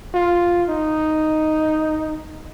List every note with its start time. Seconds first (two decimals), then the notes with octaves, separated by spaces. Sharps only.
0.14 F4
0.69 D#4